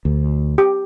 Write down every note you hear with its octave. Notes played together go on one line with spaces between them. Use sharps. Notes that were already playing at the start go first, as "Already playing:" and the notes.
D2
G4